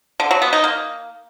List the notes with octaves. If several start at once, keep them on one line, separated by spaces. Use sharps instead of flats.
D3
F#3
B3
D#4
A#3